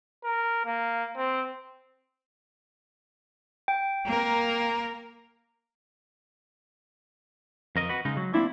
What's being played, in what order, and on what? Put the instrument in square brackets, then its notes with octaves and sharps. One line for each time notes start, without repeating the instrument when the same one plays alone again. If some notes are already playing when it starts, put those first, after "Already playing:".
[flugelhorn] A#4
A#3
C4
[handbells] G5
[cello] A#3 A#4
[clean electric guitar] F2 A#4 D#5
F#4 B4
C#3 G#3 D#4
F#3
[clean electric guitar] A#3 C4 D4 [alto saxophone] E4